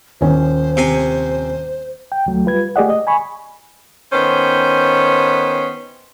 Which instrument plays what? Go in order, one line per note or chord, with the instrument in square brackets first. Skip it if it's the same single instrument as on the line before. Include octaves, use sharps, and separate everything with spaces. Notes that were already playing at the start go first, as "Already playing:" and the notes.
[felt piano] D#1 C#4 [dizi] C5
[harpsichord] C3 G#5
[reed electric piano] G5
D2 F#3 A3
G3 F4 B4 G#6
A3 G4 G#4 D5 D#5 F#5
D#5
G#5 B5 C#6
[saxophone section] D#3 B3 C#4 C5